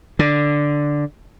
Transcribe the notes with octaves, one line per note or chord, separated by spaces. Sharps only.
D3